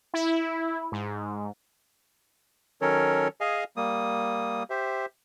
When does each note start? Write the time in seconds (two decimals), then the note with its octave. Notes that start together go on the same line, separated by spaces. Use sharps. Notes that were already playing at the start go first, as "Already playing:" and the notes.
0.14 E4
0.92 G#2
2.81 D#3 F#3 C#4 A4 A#4 C#5
3.41 G#4 D#5 F5 G#5
3.77 G3 A#3 D#6
4.70 G4 C5 E5